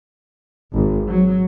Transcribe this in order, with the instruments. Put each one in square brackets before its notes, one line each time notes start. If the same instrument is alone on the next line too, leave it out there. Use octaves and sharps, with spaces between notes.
[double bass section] G#1
F#3